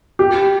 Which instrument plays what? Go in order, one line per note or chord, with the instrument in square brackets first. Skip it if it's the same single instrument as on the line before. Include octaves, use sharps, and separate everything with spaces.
[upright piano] G4